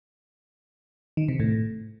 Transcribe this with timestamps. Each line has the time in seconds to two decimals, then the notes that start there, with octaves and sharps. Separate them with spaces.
1.17 D#3
1.28 C3
1.40 A2